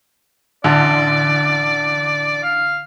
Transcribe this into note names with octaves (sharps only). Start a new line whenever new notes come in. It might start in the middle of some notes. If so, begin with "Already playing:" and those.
A1 D3 D5
F5